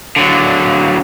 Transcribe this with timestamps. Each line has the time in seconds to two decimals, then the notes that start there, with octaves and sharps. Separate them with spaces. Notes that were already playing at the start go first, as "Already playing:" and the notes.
0.16 D3 F#3